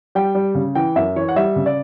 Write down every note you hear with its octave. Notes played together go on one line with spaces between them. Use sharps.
G3 G5
G3
C#3
E3 G5
F#2 E5
E3 C#5
F#5
G3 E5
C#3
D5